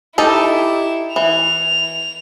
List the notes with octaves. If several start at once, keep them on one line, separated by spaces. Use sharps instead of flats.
D#4 E4 G4 A4 E7
E3 F7